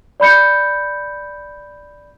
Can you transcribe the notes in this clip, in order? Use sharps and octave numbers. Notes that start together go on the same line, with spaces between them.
D5 B5 G6 C#7